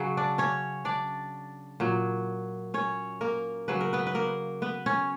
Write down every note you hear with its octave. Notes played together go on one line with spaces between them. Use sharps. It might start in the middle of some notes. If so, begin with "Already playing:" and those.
Already playing: C#3 F#3
D4 D5
C#4 C#5
D4 D5
A#2 F#3
C#4 C#5
A#3 A#4
C#3 F#3 B4
A#4
B3 B4
B4
A#3 A#4
B3 B4
C#4 C#5